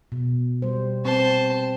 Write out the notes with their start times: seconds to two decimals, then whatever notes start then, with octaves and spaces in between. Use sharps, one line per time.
0.12 B2
0.62 G3 C5
1.05 C4 C5 A5